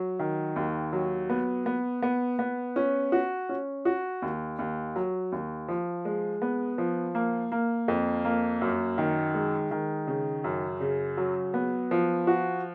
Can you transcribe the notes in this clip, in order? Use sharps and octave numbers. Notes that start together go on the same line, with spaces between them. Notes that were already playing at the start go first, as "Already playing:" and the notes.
Already playing: F#3
D#3
D#2
F#3
B3
B3
B3
B3
C#4
F#4
C#4
F#4
D#2
D#2
F#3
D#2
F3
G#3
B3
F3
A#3
A#3
F2
A#3
F#2
D#3
G#3
D#3
C#3
F#2
C#3
F#3
B3
F3
F#4